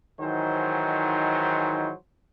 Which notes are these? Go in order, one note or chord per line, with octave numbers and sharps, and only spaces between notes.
G#2 D#3 E3 F#3 C5